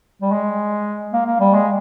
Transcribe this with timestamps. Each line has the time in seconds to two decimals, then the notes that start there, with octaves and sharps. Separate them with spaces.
0.22 G3
0.32 G#3
1.13 A#3
1.26 A#3
1.40 G3
1.54 G#3